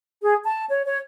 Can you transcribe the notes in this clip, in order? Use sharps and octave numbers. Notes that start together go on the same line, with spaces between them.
G#4
A5
C#5
C#5